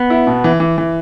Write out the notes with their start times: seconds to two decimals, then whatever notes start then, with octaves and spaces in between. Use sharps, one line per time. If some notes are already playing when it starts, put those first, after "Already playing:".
Already playing: B3
0.10 E4
0.27 B2
0.44 E3
0.60 E3
0.78 E3